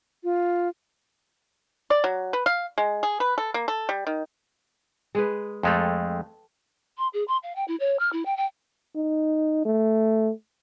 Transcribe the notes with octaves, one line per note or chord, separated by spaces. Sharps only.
F4
D5
F#3
B4
F5
G#3
G#4
B4
A4
A#3
A4
G3
D#3
G#3 G#4 B4
F2 G#3 A3 A4 G5
C6
G#4
C6
F5
G5
E4
C#5
F6
E4
G5
G5
D#4
A3